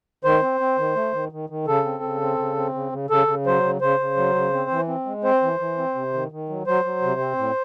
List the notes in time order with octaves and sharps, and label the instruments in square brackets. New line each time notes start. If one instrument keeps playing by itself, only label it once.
[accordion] D#3 C5
C4
C4
D#3
A3
D#3
D#3
D#3
C#3 A4
C4
C#3
C4
C#3
C4
C#3
C#3
C#3 A4
C#3
F#3 C5
C#3
C#3 C5
C#3
F#3
C#3
C4
E3
C4
G#3
C4 C5
E3
E3
C4
C3
D#3
D#3
F#3
F#3 C5
F#3
C3
C4
A2